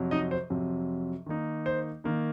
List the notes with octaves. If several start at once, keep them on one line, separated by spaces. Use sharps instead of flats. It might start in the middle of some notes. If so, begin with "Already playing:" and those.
Already playing: F2 C3 F#3
D#4 D#5
C5
F2 C3 F#3
D#3 A#3 D#4
C5
D#3 A#3 D#4